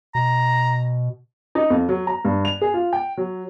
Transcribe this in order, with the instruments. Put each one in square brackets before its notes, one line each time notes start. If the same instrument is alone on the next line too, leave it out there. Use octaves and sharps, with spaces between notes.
[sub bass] B2 [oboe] A#5
[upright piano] D#4
F2
F#3
A#5
G2
F7
G#4
F4
G5
F#3